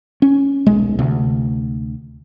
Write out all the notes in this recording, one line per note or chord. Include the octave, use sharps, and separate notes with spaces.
C#4
D#1 B1 G#3
D2 C3